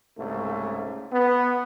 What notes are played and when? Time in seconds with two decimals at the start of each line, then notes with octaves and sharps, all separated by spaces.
0.18 C2 G#2 C#3 A3
1.12 B3